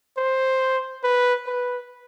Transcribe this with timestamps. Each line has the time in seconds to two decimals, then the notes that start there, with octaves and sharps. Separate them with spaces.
0.17 C5
1.04 B4
1.47 B4